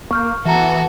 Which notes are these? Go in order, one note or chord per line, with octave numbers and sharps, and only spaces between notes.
A#3 C#6 F6 G6
E3 B3 F#4 A4 E5 A#5